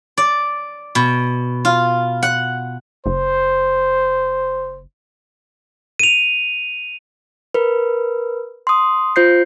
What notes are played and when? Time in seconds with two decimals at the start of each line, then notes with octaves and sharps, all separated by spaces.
0.18 D5
0.95 B2
1.65 F4
2.23 F#5
3.06 F#1 C5
5.99 D#7 F7
7.54 A#4 B4
8.67 C6 D#6
9.16 F4 C5 G6 C7